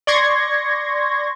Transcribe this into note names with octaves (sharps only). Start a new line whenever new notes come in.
D5 C6 C#6 G#6 A#6